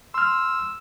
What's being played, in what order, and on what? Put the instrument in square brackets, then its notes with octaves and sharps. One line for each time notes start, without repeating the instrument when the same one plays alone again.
[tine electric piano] C6 F6 [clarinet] E6